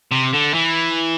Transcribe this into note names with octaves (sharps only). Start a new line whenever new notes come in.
C3
D3
E3